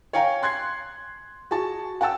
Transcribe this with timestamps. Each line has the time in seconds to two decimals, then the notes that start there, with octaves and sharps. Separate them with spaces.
0.13 C#5 F5 G5 G#5 A#5
0.43 C6 F#6 G#6 C7
1.51 F#4 G#4 A5
2.01 F#5 G5 A5 E6